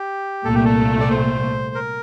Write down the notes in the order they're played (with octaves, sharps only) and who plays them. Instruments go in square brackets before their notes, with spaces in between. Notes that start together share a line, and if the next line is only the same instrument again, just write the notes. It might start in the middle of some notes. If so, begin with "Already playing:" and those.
Already playing: [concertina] G4
[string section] C2 A#2 A3 [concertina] A4
[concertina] G4
A4
D5
C5
A#4